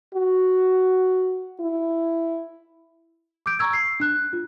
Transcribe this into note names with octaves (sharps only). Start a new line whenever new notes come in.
F#4
E4
D6 E6 G6 D7
A#5 C#6 E6 G#6
C7
D4 F#6
F4